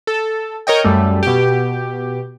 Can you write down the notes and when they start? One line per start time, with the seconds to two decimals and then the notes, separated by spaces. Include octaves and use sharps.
0.07 A4
0.67 A#4 C#5 D#5 G5
0.84 F#2 G3 A3
1.23 B2 G4